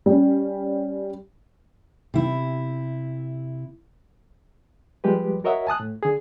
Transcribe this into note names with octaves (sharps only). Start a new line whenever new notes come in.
G3 C#4
C3 E4
F3 G3 G#3 G4 B4
F#4 A#4 C#5 D#5 E5 F#5
G#5 A5 D#6 F#6
A2
D3 G#4